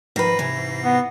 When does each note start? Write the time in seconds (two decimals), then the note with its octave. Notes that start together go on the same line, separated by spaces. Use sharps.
0.16 G#2 D#3 F3 B4 A#6 C7
0.39 C3 E3
0.85 B3